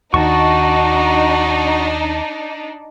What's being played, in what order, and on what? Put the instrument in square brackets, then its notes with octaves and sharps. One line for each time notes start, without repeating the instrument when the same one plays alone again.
[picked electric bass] D#2 D#3 [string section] D4 D#4 [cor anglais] F#4 [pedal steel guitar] A5 C#6